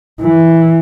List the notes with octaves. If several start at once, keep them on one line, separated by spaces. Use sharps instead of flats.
E3